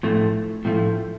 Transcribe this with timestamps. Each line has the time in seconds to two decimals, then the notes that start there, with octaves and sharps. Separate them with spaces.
0.03 A2 F3 A3
0.65 A2 F3 A3